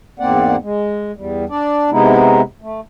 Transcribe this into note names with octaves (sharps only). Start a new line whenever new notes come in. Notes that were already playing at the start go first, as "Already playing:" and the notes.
E2 G#2 A#3 C4 D5 F#5
G#3
E2 G3
D4 D5
C3 G#3 B3 D#4 E4
A3